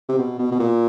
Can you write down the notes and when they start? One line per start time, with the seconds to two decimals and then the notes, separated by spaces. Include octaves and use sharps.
0.09 C3
0.19 B2
0.39 B2
0.52 B2
0.59 A#2